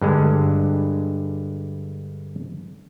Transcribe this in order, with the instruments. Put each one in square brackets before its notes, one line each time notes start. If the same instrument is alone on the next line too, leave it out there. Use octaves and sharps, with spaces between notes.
[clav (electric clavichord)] G2 D3 G#3